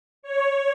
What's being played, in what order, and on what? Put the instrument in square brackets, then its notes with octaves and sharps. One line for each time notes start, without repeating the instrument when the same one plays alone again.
[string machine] C#5